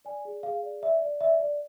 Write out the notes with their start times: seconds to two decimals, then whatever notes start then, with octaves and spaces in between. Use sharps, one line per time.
0.05 D5 G#5
0.25 G#4
0.43 G#4 F5
0.63 D5
0.82 D5 E5
1.02 D5
1.20 D5 E5
1.40 D5